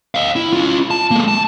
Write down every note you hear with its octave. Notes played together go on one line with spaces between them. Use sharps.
D#5 F5
E4
C#4 F4
A5
G#3 A#3
A5